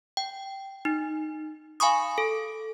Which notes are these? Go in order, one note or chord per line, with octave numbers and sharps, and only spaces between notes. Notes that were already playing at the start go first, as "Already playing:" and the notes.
G5
D#4
F5 G#5 B5 C#6 D#6
A4